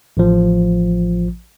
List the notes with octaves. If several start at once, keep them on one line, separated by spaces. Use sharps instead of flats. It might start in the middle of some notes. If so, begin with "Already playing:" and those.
A1 F3